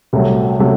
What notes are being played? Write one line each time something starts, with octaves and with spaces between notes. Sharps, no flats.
C2 C3 F#3 A3
C3 F#3 A3